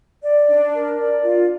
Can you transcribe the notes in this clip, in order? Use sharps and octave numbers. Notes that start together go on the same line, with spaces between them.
D5
D4
A#4
D5
F4